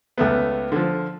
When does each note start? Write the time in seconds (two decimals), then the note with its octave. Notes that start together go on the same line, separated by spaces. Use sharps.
0.18 C#2 A3 B3
0.72 D3 F3